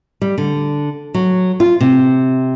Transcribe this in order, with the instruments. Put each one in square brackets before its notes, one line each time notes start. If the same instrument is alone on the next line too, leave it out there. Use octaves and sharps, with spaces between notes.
[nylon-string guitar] G3
D3
F#3
F4
C3